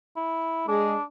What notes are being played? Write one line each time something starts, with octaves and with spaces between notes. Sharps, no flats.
E4
G#3 D4 G#4